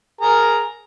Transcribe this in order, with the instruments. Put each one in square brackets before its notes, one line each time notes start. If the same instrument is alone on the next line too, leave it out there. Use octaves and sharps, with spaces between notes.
[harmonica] G#4 A#4 A#5